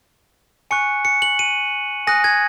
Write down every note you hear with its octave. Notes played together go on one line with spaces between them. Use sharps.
G#5 C#6 F#6 C#7
C#7
F#7
D#7
G#5 D#6 F#6 A#6
G#6